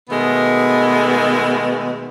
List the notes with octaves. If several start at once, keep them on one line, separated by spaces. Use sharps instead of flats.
B2 D#3 G#3 A3 B3